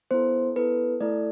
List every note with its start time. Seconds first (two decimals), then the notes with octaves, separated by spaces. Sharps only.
0.11 B3 E4 A4 C5
0.56 B3 E4 A4 B4
1.01 A3 E4 A4 D5